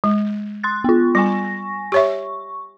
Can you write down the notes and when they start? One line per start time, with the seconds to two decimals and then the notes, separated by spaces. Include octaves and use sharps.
0.04 G#3
0.63 C6 F#6 A6
0.84 B3 F4
1.15 G3 G#5 C#6 A#6
1.92 G4 C#5 E5 C#6